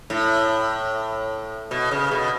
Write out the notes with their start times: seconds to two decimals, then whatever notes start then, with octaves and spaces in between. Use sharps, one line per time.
0.10 A2
1.71 B2
1.91 C#3
2.11 B2